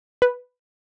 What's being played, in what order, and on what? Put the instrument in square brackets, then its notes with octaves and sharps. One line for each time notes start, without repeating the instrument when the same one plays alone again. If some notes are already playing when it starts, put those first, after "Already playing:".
[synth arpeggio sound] B4